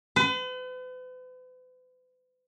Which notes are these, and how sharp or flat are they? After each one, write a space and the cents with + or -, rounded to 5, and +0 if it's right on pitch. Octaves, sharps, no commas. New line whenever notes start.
B4 +45